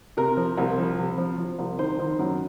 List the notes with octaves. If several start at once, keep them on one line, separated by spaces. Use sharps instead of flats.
C3 A#4
F3
C2
F3
C3
F3
F3
C2
D#3 C5
D#3
F#2